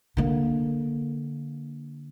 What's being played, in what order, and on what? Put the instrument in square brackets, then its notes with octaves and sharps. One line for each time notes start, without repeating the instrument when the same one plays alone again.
[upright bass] D3 A#3